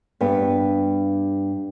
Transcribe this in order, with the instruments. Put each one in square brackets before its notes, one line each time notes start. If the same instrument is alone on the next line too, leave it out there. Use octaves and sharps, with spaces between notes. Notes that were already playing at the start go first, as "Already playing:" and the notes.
[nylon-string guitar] G2 B3